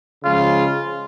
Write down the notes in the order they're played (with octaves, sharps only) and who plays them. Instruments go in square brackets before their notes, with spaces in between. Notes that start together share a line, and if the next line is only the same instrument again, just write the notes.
[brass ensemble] C#3 F3 G#3 F4